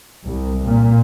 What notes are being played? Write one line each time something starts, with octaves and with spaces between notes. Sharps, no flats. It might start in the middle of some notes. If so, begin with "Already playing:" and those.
C2
A#2